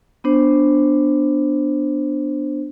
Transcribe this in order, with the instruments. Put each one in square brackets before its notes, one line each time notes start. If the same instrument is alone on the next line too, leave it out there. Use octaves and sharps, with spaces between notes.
[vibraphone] B3 D4 C5